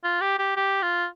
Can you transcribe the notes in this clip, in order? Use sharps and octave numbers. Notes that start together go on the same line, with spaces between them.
F4
G4
G4
G4
F4